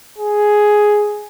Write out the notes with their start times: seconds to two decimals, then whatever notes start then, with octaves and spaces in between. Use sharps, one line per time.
0.18 G#4